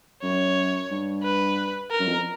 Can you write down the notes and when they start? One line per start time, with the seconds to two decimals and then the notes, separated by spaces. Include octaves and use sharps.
0.23 F#2 C#5
0.90 G2
1.24 B4
1.91 A#4
2.00 F#2
2.08 F2